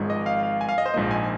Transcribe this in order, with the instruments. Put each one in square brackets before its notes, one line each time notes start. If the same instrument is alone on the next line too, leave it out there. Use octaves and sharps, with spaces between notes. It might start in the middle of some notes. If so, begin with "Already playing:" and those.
Already playing: [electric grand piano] G#1 G#2 F3 G#3
D#5
F5
F5
G#5
F5
D#5
C5
A#1 G#2 F3 A#3 D#5
G#5